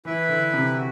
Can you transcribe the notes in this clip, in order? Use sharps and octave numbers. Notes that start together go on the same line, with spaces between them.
E3 E4 B4 E5
D3
C3
F#4